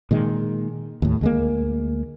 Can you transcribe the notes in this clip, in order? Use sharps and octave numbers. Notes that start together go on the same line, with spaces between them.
A#2 D#3 G#3
D#2 A2
D2 G#3 A#3